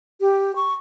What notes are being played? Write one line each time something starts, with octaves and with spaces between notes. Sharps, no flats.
G4
C#6